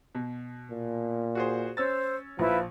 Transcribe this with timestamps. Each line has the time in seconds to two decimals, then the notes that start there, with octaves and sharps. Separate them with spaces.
0.15 B2
0.70 A#2
1.35 F#4 G#4 C5
1.77 C#4 C5 E6 A6
2.39 A#1 F3 E4 F4 B4